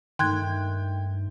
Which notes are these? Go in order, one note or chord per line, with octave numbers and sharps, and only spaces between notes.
G2 D#3 A3 G5 C6 F#6 G#6